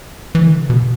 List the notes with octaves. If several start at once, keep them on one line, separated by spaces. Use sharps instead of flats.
E3
D3
C3
B2